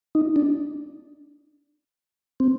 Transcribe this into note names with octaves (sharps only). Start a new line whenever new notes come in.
D#4
D4
C4